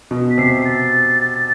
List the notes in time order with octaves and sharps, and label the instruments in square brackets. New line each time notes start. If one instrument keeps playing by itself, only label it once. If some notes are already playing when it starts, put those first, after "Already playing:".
[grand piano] B2
[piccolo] B6
[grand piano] C3 [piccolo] C7
[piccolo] A6